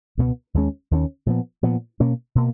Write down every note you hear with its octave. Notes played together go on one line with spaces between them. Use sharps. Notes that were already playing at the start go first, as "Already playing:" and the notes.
C#2 B2 G#3 B3
D#2 D#3 G#3 C#4
D#2 D#3 G#3 C#4
A#2 F3 B3
A#2 F3 B3
B2 A#3 C#4
B2 A#3